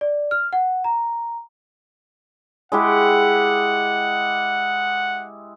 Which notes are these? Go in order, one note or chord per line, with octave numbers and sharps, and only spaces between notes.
D5
F6
F#5
A#5
G#3 E4 G4 F#5